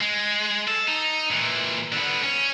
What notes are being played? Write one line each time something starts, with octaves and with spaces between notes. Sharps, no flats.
G#3
A4
D#4
A#2 E3
D3 B3
C#4